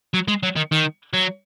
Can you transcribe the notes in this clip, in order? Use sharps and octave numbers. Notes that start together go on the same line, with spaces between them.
F#3
G#3
F#3
D#3
D#3
F#3